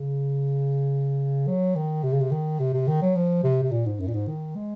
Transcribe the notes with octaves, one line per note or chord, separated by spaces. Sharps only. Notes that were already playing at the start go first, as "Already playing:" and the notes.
Already playing: C#3
F#3
D#3
C3
C#3
C3
D#3
C3
C3
D#3
F#3
F3
C3
C3
A#2
G#2
F#2
A#2
G#2
D#3
G#3